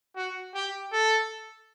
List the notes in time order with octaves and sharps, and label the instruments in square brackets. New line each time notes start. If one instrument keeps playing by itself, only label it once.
[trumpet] F#4
G4
A4